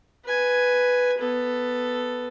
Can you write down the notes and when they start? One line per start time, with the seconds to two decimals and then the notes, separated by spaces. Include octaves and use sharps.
0.25 B4 G#5
1.18 B3 A4